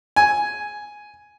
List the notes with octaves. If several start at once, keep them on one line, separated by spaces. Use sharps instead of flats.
G#5